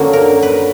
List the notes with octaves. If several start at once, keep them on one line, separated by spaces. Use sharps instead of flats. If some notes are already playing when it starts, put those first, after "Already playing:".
Already playing: F#2 D3 F#3 A#3
A#4
B4